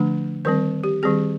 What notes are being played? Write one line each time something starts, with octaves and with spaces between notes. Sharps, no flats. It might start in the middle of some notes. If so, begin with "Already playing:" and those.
Already playing: D3 F3 A3 D4
D#3 G3 C4 A#4
G4
D#3 G3 C4 G#4